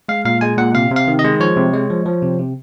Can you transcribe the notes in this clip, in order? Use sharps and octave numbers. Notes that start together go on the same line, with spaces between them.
G#3 F5
A#2 F5
G#3 G#5
A#2 F#5
C3 F5
C3
F5
D#3
D#5
G#3
F3 C#5
C3
G#3
F3
F3
C3
C3